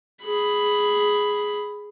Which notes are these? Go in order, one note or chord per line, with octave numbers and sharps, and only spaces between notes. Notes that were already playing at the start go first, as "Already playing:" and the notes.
G#4 B5